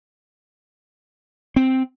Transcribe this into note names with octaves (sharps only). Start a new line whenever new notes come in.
C4